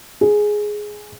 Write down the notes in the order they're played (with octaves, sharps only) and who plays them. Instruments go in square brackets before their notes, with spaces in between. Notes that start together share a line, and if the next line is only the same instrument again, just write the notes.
[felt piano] G#4